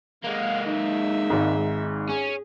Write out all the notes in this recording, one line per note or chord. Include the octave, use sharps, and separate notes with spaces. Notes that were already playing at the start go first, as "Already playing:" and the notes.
G#3 A#3 F5 F#5
D#4 E5
G#1 G#2
C#4 G#4